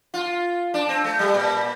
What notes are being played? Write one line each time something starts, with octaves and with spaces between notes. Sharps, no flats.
F4
D4
C4
A3
G3
A#2